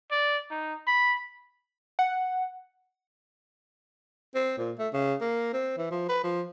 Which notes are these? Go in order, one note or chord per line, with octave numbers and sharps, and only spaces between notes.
D5
D#4
B5
F#5
C4
A#2
A3
C#3
A#3
C4
E3
F3
B4
F3